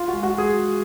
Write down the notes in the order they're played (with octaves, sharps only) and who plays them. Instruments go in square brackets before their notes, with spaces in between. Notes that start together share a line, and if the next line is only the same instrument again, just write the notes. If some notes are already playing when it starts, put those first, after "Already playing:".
Already playing: [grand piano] F4
F#4
[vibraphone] G#3
[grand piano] F#4
[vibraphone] G#3
[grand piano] G#4
[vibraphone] F#4